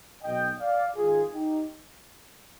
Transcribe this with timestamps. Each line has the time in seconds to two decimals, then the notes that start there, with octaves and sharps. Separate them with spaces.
0.23 B1 B2 D#5 G5
0.59 D5 F5
0.96 G#1 G#2 D#3 F4 G#4
1.32 D#4 G4